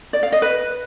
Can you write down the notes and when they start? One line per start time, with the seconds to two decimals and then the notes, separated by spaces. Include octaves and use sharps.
0.13 D5
0.23 F5
0.32 D#5
0.42 B4